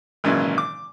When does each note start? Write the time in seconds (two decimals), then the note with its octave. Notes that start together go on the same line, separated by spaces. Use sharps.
0.24 G#1 A#2 C#3 E3 F#3
0.58 D6